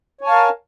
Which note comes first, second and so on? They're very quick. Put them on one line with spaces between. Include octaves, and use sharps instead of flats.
C#5 G#5 A5 F5 A#4